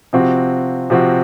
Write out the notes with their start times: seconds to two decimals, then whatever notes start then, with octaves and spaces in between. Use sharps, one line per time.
0.13 C3 F3 C4 F#4
0.90 C3 F3 C4 F#4